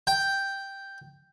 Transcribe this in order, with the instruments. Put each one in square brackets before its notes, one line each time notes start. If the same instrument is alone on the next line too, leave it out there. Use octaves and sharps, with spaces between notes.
[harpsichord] G5